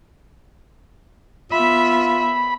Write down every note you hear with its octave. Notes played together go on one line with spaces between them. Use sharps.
B3 F4 E5 B5